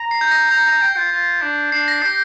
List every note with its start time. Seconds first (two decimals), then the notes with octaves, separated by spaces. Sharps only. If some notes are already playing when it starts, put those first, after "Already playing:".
Already playing: A#5
0.11 C7
0.21 G6
0.31 A#6
0.51 A#5 G6
0.66 A#5
0.81 G5
0.96 F4
1.12 F4
1.42 D4
1.72 D4 C7
1.88 A#6
2.02 G4 C7